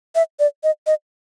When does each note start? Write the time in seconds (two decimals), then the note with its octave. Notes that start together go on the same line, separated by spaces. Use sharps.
0.15 E5
0.39 D5
0.64 D#5
0.87 D#5